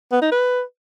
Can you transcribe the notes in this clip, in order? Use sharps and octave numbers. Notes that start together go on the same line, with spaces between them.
B3
D#4
B4